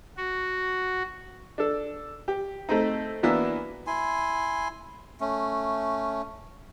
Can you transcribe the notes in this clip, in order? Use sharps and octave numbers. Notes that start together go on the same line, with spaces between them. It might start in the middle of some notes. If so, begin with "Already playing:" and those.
F#4
D4 A4
G4
A3 C4 D#4
E3 F#3 A#3 B3 D4 E4
E4 G#5 C6
A3 C#4